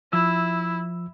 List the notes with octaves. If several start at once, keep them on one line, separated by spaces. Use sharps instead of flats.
F3 E4 E6